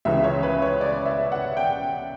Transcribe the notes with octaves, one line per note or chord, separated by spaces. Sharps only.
C#2 C#3 E3 E5
C#5
B4
C#5
D5
E5
F#5
G5